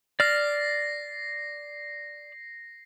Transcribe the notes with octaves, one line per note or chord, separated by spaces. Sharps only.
D5 F6 A#6 C7